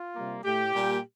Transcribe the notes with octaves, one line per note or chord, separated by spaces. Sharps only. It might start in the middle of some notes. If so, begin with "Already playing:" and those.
Already playing: F4
C3 G3 A#3
A2 A3 G4
A#2 G3 A#3